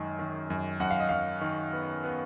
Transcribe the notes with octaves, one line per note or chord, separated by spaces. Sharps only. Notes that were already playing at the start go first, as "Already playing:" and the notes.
Already playing: F#2 D#3 G#3
D#3
F#2
F#2 F#5
F5
D#5
F#2 F5
D#3
B3
B3